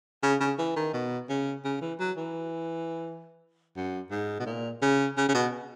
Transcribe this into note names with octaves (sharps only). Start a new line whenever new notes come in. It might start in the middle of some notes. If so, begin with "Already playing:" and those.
C#3
C#3
E3
D#3
B2
C#3
C#3
E3
F#3
E3
F#2
G#2
B2
A#2
C#3
C#3
C#3
B2